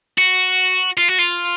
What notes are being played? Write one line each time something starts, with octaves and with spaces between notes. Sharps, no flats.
F#4
F4
F#4
F4